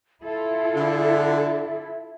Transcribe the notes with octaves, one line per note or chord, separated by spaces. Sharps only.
E4 F4 A4 E5
D3
E5